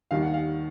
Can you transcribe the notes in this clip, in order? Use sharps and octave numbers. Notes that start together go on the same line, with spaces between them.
D#2 D#3 G3 F5
F#5
F5